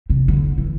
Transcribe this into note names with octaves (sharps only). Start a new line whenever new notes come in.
C3
D3
E3